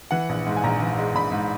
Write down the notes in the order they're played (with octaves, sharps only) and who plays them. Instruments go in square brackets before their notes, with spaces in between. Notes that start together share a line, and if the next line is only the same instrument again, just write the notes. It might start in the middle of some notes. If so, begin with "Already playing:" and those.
[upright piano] E3 F#5
A#1
G#2
G#5
A#1 A#5
E3
G#3
A#1 B5
G#2